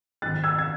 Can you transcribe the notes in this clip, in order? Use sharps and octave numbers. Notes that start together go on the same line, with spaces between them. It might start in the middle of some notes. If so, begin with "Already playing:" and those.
G#2 D#3 F#6 A6
E6 G#6
G#6